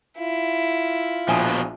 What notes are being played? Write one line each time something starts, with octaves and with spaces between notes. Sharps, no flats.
E4 F4
A#1 B2 F3 G#5 D#6